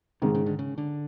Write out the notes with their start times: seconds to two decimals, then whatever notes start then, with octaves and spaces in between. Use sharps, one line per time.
0.22 G#2 C3 D#3 G#3
0.35 C#3
0.46 D3
0.59 C#3
0.78 D3